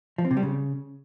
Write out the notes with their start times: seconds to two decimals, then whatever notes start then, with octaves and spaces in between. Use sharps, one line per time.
0.18 F3
0.25 C4
0.31 C3
0.37 G3
0.43 C#3